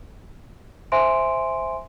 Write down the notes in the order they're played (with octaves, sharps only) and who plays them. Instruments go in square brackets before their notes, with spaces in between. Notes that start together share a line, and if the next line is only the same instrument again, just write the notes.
[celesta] C5 E5 G#5 C6 D7